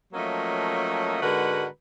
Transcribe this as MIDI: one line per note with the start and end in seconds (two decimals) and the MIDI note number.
0.14 1.20 53
0.14 1.20 54
0.14 1.20 57
0.14 1.20 58
0.14 1.20 61
0.14 1.20 75
1.21 1.65 44
1.21 1.65 50
1.21 1.65 56
1.21 1.65 66
1.21 1.65 70
1.21 1.65 71